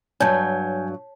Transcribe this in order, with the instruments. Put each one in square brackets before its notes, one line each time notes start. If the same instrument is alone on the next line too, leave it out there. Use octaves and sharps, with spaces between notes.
[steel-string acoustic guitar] G2 F#3 [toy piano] C#5 A5 [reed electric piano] G#5 G6 G#6